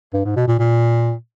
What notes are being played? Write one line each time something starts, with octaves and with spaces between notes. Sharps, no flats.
G2
G#2
B2
A#2
A#2